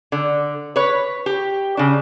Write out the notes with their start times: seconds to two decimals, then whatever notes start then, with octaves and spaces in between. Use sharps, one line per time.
0.12 D3
0.76 B4 C#5
1.26 G4
1.77 C#3 D4